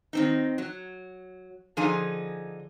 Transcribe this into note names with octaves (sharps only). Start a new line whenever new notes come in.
D#3 C4 D#4
F#3
D3 F3 D#4 G#4 G#5